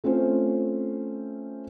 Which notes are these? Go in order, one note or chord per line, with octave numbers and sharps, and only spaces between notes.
A3 C4 C#4 F4 C5